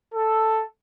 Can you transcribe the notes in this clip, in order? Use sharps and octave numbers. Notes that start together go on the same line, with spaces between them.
A4